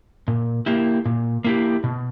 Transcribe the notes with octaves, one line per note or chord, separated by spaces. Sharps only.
A#2
A#3 E4 G4
A#2
A#3 E4 G4
B2